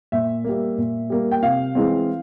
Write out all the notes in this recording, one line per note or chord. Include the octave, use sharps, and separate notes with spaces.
A#2 E5
G3 A#3
A#2
G3 A#3
G5
C3 F5
E3 G#3 C4